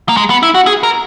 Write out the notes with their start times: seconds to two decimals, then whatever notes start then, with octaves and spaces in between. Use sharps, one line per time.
0.09 A#3
0.17 G#3
0.30 B3
0.43 E4
0.55 F#4
0.67 G#4
0.83 A#4